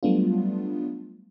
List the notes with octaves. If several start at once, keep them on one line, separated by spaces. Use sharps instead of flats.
F#3 G3 A3 B3 D4 F4